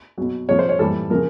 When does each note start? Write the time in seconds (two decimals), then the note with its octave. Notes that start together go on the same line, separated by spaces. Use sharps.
0.18 B2 F#3
0.49 C3 F3 C#5
0.59 C5
0.69 C#5
0.79 A2 E3 G3 A4
1.10 C#3 F3 A#4